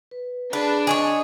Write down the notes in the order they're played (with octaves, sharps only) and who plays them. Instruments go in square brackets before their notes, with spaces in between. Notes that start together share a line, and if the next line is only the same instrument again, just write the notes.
[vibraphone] B4
[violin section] D4 [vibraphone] G#4 B5 [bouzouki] B4
[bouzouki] G#4 C5 C#5 [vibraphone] D#5